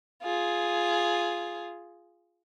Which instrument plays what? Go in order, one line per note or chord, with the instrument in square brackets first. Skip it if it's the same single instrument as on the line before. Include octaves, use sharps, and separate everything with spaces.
[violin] F4 G#4